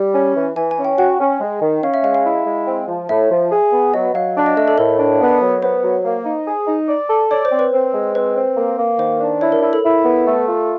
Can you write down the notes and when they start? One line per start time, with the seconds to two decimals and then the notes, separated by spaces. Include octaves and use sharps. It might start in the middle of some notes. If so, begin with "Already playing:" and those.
Already playing: G3
0.15 C#4
0.35 E3
0.56 E3 G#5
0.71 G#5
0.78 C#4
0.84 G5
0.98 F#4 G5
1.20 C#4
1.41 G#3
1.62 D#3
1.83 C#4 F5
1.94 E5
2.04 G#3 F5
2.14 F5
2.25 E4
2.46 G#3
2.68 C4
2.88 F3
3.09 A2 E5
3.31 F3
3.52 G#4
3.73 B3
3.94 F#3 D#5
4.15 F#3 F5
4.36 D4
4.46 D#5
4.57 A3 D#5
4.68 A4
4.78 A2 A#4
4.99 D4
5.20 B3
5.42 F#3
5.62 B3 C5
5.84 F#3
6.04 A#3
6.26 D#4
6.47 G#4
6.68 D#4
6.89 D5
7.10 A4
7.31 C#5 D5
7.45 C5
7.52 C4
7.59 B4
7.73 C4
7.94 G#3
8.15 C4 B4
8.36 C4
8.57 A#3
8.79 A#3
8.99 D#3 C5
9.20 D4
9.41 E4 C#5
9.52 A#4
9.63 E4
9.73 A4
9.84 E4
10.05 B3
10.26 A3
10.47 F4